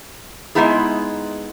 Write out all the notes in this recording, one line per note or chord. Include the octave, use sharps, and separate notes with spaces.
G#3 A3 B3 D#4 E4 G#4